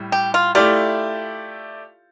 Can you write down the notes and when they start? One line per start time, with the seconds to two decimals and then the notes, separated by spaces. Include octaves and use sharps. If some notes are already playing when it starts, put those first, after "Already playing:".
Already playing: A2 G3
0.12 G4
0.34 F4
0.55 A3 E4 F4 G4 D5